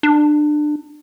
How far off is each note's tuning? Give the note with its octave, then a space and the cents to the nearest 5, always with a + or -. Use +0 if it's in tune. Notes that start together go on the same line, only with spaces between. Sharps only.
D4 +25